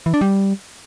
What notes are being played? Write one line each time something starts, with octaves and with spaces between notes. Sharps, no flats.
E3
D4
G3